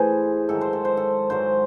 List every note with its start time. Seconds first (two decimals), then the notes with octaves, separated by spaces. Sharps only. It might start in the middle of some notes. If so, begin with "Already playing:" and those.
Already playing: A2 E3 G#4 C5
0.49 G#2 D#3 F#3 A4
0.61 C5
0.73 A4
0.85 C5
0.97 A4
1.30 G#2 F#3 C5